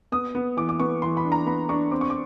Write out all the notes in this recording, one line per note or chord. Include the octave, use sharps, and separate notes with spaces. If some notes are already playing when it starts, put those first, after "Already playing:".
B3 D#6
B3
E3 D6
D6
B3 C#6
E3 C6
B5
D4
A#5
B3 B5
D4 C#6
C4 D6
C#6
D6